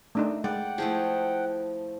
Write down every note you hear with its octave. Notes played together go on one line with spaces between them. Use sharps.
A3 D4 D#4
G#3 D5 F#5 G5
F3 A3 E4 G#4